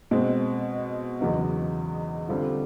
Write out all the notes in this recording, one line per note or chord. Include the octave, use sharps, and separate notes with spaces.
B2 G#3 C4
E2 C#3 F#3 B3 D#4
D3 G3 C4 F4